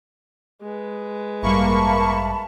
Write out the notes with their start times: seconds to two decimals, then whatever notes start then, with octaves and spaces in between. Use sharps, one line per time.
0.62 G#3 B4
1.43 A1 G2 G3 A#3 E5 A5 B5 C#6